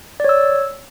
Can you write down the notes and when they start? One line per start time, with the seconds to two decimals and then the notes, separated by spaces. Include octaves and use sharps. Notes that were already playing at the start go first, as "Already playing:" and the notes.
0.20 D5
0.24 C#5
0.29 E6